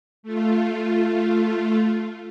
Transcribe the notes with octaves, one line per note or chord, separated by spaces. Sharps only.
A3 F4